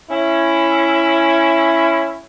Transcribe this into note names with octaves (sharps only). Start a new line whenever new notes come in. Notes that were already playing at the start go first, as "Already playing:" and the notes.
C#4 E4